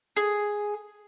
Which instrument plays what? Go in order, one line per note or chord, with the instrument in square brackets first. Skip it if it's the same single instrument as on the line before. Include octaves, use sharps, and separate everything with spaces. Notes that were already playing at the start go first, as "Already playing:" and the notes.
[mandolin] G#4